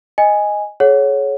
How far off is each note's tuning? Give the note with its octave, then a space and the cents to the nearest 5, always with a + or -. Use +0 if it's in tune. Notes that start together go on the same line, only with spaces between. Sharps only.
D#5 +0 G#5 -5
G#4 +35 C#5 +0 F#5 -10